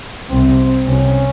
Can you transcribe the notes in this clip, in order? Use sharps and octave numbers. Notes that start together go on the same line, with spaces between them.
C2 C3 C4
C2 C3 C#4